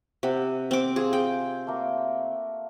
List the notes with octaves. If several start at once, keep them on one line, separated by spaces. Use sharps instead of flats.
C3 F#5
C4 D6
F4 G#4
G5
A3 A#3 F#4